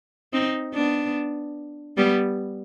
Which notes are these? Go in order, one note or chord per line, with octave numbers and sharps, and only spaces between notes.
C4 D#4
B3 D4
G3 B3